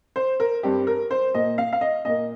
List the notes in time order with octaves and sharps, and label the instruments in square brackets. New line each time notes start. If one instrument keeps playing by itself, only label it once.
[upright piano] C5
A#4
G2 G3 C4 G4
A#4
C5
A#2 A#3 D#5
F5
F5
D#5
A#2 A#3 D#5